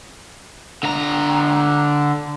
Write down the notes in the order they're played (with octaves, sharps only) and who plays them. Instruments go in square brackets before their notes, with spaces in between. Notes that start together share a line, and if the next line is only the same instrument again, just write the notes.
[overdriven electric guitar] D3 A#5